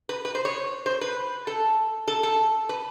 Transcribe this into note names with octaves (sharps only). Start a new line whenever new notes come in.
B4
B4
C5
C#5
C5
B4
A4
A4
A4
B4